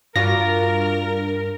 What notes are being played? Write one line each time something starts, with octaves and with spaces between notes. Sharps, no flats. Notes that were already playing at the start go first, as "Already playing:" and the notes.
G2 D4 F4 F#4 A#4 A#6